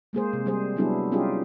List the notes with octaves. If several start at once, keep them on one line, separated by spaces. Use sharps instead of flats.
G#3 A#3 G#4 C5
C3
G3 G#4 C5
F#3 G3 B3 D4 E4 G#4
G3 C#4 D#4 F4 G4 G#4